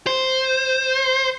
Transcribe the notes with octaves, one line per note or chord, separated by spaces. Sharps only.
C5